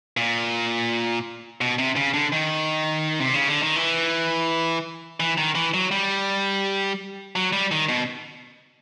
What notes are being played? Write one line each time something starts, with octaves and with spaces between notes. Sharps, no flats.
A#2
B2
C3
C#3
D3
D#3
C3
C#3
D3
D#3
E3
E3
D#3
E3
F#3
G3
F#3
G3
D#3
B2